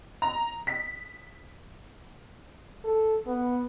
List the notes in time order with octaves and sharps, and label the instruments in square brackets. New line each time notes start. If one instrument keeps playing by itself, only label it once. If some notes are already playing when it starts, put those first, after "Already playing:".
[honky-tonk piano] A#5
B6
[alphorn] A4
B3